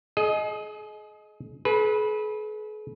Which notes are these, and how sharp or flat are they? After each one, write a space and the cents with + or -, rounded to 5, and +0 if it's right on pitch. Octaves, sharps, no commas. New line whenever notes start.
G#4 +35 D#5 +0
G#4 +45 B4 -15